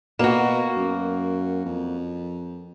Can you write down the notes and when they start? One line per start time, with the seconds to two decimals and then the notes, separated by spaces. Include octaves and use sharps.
0.19 B2 A#3 F#4
0.76 F#2
1.66 F2